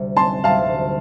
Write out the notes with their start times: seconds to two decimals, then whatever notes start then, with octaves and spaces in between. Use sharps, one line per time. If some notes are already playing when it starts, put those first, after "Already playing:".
Already playing: D2 C3 G3
0.17 A5 C6
0.44 D2 C3 G3 F5 A5